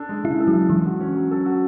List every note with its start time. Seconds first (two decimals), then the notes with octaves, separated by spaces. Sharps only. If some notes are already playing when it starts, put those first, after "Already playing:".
Already playing: D4 A4
0.09 G#3
0.24 C#3 E4
0.40 A4
0.48 F#3
0.55 D4
0.70 E3 A4
0.86 F#4
1.00 C#4
1.15 F#3
1.31 A4
1.46 F#4